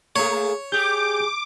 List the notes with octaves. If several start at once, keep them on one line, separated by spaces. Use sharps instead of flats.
A3 A#3 G#4 C#5
G4 G#4 D6 G6